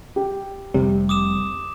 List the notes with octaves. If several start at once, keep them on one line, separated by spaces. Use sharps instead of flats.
G4
F1 D#2 C3 G3
D6 D#6 E7